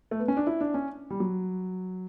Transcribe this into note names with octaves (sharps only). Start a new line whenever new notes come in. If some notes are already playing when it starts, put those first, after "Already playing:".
A3
B3
C#4
D4
E4
D4
C#4
G3
F#3